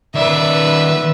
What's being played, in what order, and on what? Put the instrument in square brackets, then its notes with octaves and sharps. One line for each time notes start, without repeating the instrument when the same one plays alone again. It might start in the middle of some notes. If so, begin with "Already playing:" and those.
[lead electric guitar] D#3 D5 [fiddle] B4 E5